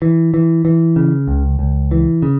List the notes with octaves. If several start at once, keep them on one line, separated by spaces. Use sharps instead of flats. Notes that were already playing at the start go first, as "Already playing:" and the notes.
E3
E3
E3
C#3
C#2
C#2
E3
C#3